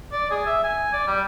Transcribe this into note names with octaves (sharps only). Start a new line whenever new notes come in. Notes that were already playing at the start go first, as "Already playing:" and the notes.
D5
G#4
E5
G#5
D5
G3